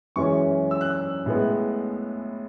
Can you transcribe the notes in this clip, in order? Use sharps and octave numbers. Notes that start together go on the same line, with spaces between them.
F#2 E3 G#3 C#4 C#6
E6
F#6
E6
A2 G#3 B3